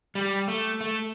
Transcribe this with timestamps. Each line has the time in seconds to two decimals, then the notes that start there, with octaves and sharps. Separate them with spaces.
0.15 G3
0.48 A3
0.81 A3